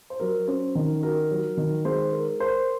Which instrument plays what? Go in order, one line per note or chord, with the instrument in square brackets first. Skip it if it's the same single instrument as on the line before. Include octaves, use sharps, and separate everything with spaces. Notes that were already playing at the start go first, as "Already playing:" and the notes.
[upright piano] C5
[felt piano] F#3 [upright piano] A#4
[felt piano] C#4 [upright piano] C5
[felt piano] D#3 [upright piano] A#4
[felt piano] F#4 [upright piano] A#4
[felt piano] F#3
D#3
[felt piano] G#3 [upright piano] C5
[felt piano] A#4
[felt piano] A#4 [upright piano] C5